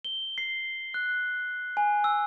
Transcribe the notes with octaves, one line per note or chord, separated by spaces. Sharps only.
G7
C7
F#6
G#5
E6